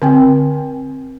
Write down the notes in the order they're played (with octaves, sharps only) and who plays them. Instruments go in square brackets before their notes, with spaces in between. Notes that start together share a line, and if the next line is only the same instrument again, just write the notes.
[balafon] D3 C4 G5